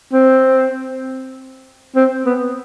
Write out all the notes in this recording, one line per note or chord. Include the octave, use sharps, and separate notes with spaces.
C4
C4
B3